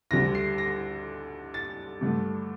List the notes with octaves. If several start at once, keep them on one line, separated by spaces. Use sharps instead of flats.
D2 D3 G3 A#6
C7
A#6
A6
G2 D3 A3